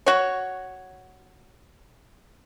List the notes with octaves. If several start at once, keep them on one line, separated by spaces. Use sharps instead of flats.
F#4 C#5